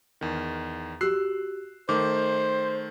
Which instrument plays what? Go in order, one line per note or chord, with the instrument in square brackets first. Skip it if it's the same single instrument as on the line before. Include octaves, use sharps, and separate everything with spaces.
[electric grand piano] E2 D#3
[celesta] F#4 G4 [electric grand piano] E6 F#6 C7
[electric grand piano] D#3 A3 [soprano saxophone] C5 [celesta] D6